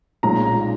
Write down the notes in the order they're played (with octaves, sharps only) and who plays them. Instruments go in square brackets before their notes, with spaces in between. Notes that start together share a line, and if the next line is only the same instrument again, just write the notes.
[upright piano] B1 A#2 G#3 C#4 A#5